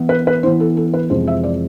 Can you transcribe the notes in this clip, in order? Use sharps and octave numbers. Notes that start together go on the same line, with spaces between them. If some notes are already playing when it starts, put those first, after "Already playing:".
Already playing: E3 B3 E4
B4
B4
E3 B3 E4 C5
A4
A4
B4
F2 C3 E3 G#3 C5
E5
D5